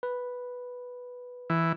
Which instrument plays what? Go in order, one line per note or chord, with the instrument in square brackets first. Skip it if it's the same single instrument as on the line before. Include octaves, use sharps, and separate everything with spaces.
[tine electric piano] B4
[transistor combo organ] E3